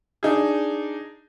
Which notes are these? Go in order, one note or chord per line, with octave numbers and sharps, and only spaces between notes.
D4 D#4 G#4